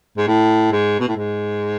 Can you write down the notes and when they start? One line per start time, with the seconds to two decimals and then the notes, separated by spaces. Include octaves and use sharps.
0.17 G#2
0.27 A2
0.72 G#2
1.00 B2
1.08 A2
1.17 G#2